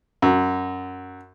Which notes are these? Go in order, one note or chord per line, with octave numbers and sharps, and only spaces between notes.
F#2